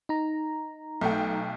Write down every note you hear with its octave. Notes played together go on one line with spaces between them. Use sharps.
D#4 A#5
B1 A3 G5